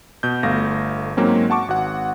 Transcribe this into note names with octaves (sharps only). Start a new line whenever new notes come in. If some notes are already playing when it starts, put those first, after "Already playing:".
B2 G6
G1 A3 F5 A#6
G#2 F#3 A#3 C4 C#4
F#5 A5 C#6 D6
G#1 F#4 F#5